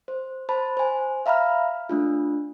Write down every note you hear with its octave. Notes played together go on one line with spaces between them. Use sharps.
C5
C5 A5 B5
C5 G#5
E5 F5 A#5 B5 F6
A3 D4 F4